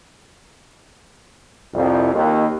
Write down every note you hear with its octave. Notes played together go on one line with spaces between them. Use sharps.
C2 F2
D#2